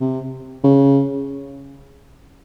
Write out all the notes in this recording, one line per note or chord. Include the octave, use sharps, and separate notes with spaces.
C3
C#3